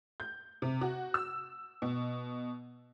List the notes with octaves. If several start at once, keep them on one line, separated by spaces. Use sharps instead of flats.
G6
C3
F#4
E6
B2